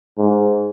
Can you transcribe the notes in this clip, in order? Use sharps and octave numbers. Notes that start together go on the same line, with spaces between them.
G#2